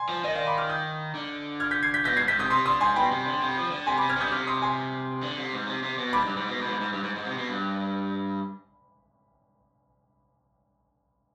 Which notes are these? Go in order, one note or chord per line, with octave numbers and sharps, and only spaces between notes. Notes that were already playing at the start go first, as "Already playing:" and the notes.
Already playing: G#5 C6
F3
D#3 D#5
D5 F5
B5 D6
D6 F6
D#6 G6
D3
F6 G#6
G6 B6
G#6 C7
G6 B6
B2 G6 B6
G#2 G#6 C7
G#2 G6 B6
C3 D#6 G6
C3 C6 D#6
D3 C6 D#6
G#2 G#5 C6
B2 G5 B5
C3
D3
C3
F3
D3
C3 G#5 C6
B5 D6
C3
F6 G#6
C3
D#6 G6
D3
C3 D6 F6
C6 D#6
G#5 C6
D3
C3
G#2
C3
C3
B2
G#2 B5 D6
G2
G#2
B2
G#2
B2
G#2
G#2
G2
G#2
G#2
C3
B2
G2